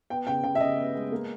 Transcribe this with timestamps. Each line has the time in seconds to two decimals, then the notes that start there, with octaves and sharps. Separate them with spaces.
0.10 B3 G5
0.27 C#3 G5
0.44 C#3 G5
0.55 E5
0.61 C#3 D#5
0.78 B3
0.95 G#3
1.12 A#3